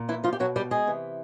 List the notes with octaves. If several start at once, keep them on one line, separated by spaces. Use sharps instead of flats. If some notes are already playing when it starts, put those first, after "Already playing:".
Already playing: A#2
E3 E4
F3 F4
G4
B2 F#3 F#4
G3 G4
G#3 G#4
C3 E3